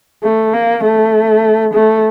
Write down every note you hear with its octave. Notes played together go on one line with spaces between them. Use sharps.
A3
A#3
A3
A3